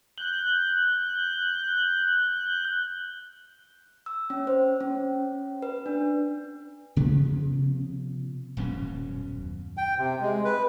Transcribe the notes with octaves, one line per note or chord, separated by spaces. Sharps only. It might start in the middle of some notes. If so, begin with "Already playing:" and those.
F#6 G6
E6
C#4
C5
C#4
B4
D4
C3 F3 B3 C#4
D#1 F#2 B2 C#4
G5
C3
G#3
B4